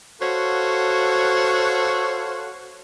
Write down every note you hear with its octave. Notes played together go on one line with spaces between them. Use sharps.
F#4 A4 C5 C#5 F5 F#5